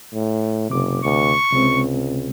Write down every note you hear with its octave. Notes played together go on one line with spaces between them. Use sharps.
A2
F#1 C3 D6
D2 C#6
C#2 C3 G#3 C4